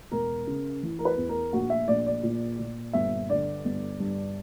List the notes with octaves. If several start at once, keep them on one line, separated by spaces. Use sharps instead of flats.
E1 A#4
C#3
E3
A#4
B4
E2
A#4
A#1 F#4
E5
A#1 D5
D5
A#2
A#2
G1 E5
D3 D5
G1
G2